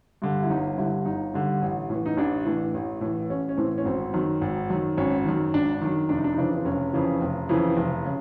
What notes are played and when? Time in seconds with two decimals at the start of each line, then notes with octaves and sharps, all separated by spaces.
0.22 G2 D3
0.43 E4
0.49 G1 D#4
0.78 G2 D3 E4
1.05 G1 D#4
1.34 G2 D3
1.62 A1
1.90 A2 E3
2.06 D#4
2.17 A1 D4
2.45 A2 E3
2.74 A1
3.01 A2 E3
3.29 A1 C#4
3.49 C#4
3.57 A2 E3 C4
3.78 C#4
3.85 G#1 C4
4.14 F#2 D#3
4.41 G#1
4.70 F#2 D#3
4.97 G#1 C#4
5.25 F#2 D#3
5.54 G#1 D4
5.81 F#2 D#3
6.09 F1 D4
6.17 D#4
6.24 D4
6.32 D#4
6.37 F2 C#3 E3 D4
6.58 C4
6.65 F1 C#4
6.93 F2 C#3 E3
7.21 F1
7.49 F2 C#3 E3
7.77 F1
8.06 C#3